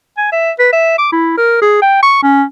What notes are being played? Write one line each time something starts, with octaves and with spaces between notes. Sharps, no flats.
G#5
E5
B4
E5
D6
E4
A#4
G#4
G5
C#6
C#4